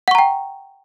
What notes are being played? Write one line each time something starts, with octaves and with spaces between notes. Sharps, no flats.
F#5 G5 A#5 C#6